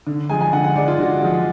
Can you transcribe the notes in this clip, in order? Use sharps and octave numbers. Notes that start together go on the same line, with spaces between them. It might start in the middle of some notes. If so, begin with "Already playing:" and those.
D3
F3 G#3 G#5
G#5
D3 F#5
F#5
F3 G#3 D5
F4
D3 F#4
F3 G#3